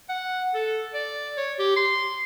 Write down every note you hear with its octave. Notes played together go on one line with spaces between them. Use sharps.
F#5
A4
D5
C#5
G4
C6